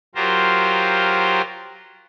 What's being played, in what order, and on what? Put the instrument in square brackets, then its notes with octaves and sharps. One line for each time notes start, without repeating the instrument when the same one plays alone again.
[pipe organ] F#3 F4 G4 A#4 C5